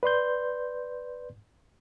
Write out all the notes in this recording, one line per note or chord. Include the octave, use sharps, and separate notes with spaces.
B4 D5 C6 G6